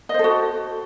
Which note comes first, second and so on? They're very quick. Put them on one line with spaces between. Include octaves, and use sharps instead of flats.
D#5 C5 A4 F#4